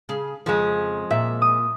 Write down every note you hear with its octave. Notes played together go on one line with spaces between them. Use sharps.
C#3 G#4
F2 C#3 F3 G#3
A#2 E5
D#6